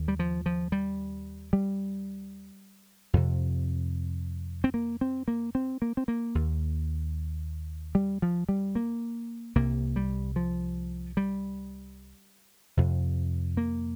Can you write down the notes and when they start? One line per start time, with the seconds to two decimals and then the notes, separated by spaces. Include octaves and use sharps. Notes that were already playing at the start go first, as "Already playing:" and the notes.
Already playing: D#2
0.08 G3
0.19 F3
0.46 F3
0.72 G3
1.53 G3
3.13 F2 C3
4.64 C4
4.74 A#3
5.01 C4
5.28 A#3
5.55 C4
5.82 A#3
5.97 C4
6.08 A#3
6.35 D#2
7.95 G3
8.22 F3
8.49 G3
8.75 A#3
9.55 C2 C3 A#3
9.96 G3
10.36 F3
11.17 G3
12.77 F2 C3
13.57 A#3